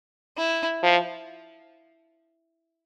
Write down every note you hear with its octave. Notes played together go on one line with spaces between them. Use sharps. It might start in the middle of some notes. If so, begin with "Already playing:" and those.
E4
F3